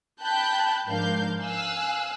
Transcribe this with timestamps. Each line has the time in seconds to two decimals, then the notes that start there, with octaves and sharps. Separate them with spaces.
0.22 G5 A5 B5 F#6 G6
0.87 G#2 F3 D4 A#4 F5 G6
1.42 F5 G#5 E6 F#6